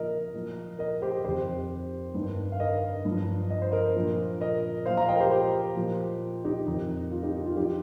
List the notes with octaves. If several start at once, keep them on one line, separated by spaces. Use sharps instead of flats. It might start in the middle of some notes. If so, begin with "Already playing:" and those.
Already playing: A#2 F3 A#4 D#5
A#2 F3
A#4 D#5
G4 C5
F2 D#3 G4 C5
G2 D#3
F5
A#4 D#5
G2
F3
D#5
C5
A#4 D#5
A#2 F3
A#4 D#5
A#2 F3 C5 F5
F5 A#5
D#5 G5
A#4
G4 C5
G4 C5
A#2 F3
D#4 G4
F2 D#3 D#4
F4
D#4 G4
D#4
F4
F3 D#4 G4